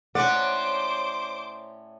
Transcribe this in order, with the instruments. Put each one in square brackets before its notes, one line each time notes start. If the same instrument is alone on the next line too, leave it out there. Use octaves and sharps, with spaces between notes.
[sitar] A2 C#4 D5 [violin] C5 D6 [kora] F#5